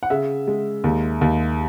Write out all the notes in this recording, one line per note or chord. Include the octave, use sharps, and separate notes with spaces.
F#5
C#3 E5
G#3
D#2
D#2